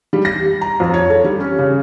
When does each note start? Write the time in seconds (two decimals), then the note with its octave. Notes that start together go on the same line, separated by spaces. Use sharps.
0.13 G3
0.25 A#6
0.61 A#5
0.80 F2
0.94 C#5
1.10 A4
1.24 G3
1.40 C#4
1.59 C#3